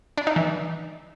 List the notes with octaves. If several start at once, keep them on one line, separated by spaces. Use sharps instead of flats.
D4
D#4
E3